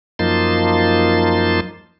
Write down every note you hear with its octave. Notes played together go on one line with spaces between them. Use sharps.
F#2 F3 A#3 D#4 A5 C6